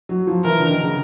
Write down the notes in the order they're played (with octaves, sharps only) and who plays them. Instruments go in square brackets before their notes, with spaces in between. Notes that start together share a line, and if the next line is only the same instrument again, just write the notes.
[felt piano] F#3
F3
[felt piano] E3 [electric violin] A#4
[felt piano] D3
D#3
C#3